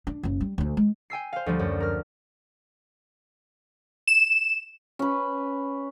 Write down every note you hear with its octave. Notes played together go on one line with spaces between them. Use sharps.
D4
F#1 C#3
G3
D2 D3
G#3
G5 G#5 E6 C7
C5 F5
D2 F3 G3
F#2
A#4 F6
E7
C#4 B4